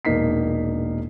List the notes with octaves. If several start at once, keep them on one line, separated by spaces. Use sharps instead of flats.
E1 A#1 A#3 D#4 B6 C7